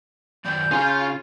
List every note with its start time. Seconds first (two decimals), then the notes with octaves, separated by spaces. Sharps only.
0.45 F#2 D#3 D5 G6
0.71 C#3 C#4 F4 G#4 C6